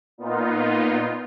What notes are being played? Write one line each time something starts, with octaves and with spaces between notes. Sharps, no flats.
A#2 B3 D#4 F4